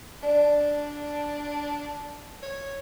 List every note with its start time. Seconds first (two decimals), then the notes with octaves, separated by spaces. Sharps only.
0.23 D4 D5
2.43 C#5